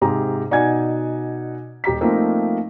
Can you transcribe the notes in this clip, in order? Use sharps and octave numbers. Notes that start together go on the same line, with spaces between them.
G#2 C3 G4 G#4 A#5
B2 D#4 D5 F#5 G#5 G#6
D#1 G4 A#5 B6
F3 A3 A#3 C4 D#4